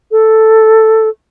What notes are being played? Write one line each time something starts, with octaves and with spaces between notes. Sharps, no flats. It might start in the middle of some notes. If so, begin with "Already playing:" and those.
A4